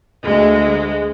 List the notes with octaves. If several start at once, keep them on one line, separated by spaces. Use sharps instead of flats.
D2 G#3